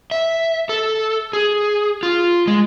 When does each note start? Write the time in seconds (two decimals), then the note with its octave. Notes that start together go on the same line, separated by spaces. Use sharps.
0.11 E5
0.69 A4
1.33 G#4
2.03 F4
2.47 G#3